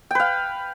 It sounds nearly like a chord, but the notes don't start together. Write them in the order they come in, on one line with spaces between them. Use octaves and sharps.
G5 B4 F5